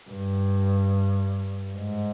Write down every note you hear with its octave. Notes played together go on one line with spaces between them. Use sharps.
G2
G#2